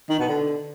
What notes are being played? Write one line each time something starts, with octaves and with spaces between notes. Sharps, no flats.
D#3
B2
D3